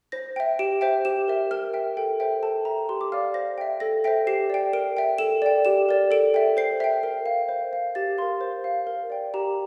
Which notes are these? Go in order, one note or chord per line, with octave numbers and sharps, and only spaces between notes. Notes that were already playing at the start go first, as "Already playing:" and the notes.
C5 A#6
E5 G5
G4 D7
C5 E5 G5
G4 E7
A#4 E5
A#4 F6
E5 G5
A4 G5
C5 E5 G5
A4 A5
E5 G5 A#5
G4 C6
D6
D5 F5 F6
C5 A#6
E5 G5
A4 A#6
C5 E5 G5 A#6
G4 C7
D5 G5
A#4 D7
E5 G5
A4 E7
D5 G5
G4 E7
A#4 D5
A4 D7
E5 G5
C5 C7
E5 G5
A#4
F5
C5
F5
G4 A6
A#4 F5 C6
C5
F5
A#4
D5 G5
G4 A#5